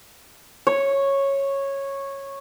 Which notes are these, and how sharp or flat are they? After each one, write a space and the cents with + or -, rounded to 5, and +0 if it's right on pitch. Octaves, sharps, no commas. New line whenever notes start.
C#5 -10